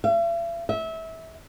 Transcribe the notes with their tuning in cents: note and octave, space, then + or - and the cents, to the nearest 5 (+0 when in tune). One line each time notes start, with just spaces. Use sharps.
E5 +45
E5 -25